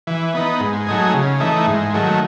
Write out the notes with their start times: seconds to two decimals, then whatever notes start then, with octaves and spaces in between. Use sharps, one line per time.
0.07 E3
0.34 B3 D#4
0.60 G#2
0.87 F#3 A3 D#4 G#4
1.14 C#3
1.40 E3 A3 D#4
1.67 G#2
1.94 D#3 F#3 A3